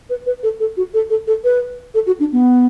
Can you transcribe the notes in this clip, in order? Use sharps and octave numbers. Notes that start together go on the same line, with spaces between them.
B4
B4
A4
A4
F#4
A4
A4
A4
B4
A4
F#4
D4
B3